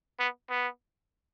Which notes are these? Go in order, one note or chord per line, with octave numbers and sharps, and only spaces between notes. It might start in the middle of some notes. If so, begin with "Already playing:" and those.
B3
B3